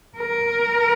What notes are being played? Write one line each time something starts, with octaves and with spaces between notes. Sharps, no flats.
A#4